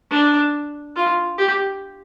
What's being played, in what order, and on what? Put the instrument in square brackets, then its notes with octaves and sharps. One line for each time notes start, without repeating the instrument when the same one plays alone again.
[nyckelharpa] D4
F4
G4